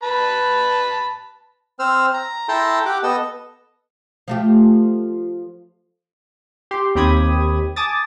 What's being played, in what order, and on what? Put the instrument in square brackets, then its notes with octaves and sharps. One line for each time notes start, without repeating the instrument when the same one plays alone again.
[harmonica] B4 A5 B5
[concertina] C4 C5 E6 F6
A#5
E4 A4 G5 A5 A#5 C6
G4 F#5 D6
B3 A4 D#5 E6
[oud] F3 A3 G4
[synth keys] G4 C6
D#2 C4 G4 B5 D#6 G#6
G#5 A5 D6 D#6 A6